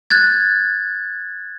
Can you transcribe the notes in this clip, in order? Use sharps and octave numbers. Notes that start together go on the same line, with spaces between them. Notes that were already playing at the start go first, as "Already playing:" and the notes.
F#6 G#6 A6